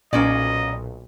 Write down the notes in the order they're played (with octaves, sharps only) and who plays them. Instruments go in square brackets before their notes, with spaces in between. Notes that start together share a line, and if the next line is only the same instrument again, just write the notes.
[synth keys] B1 A#2 [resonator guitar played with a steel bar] A#3 C#4 D5 [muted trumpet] D#5